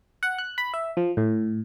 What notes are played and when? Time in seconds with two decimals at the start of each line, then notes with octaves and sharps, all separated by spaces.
0.23 F#5
0.38 F#6
0.58 B5
0.74 E5
0.97 F3
1.17 A2